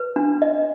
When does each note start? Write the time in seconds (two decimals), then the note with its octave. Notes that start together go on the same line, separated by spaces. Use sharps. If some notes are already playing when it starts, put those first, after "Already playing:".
Already playing: B4
0.16 D4
0.42 D#5